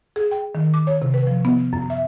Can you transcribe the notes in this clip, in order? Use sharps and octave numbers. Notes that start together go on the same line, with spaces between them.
G#4
G5
D#3
D6
C#5
C3
B4
F3
B3
F#2
E5